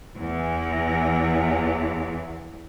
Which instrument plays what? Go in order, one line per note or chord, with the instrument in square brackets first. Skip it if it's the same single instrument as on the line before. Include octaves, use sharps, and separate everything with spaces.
[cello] E2 E3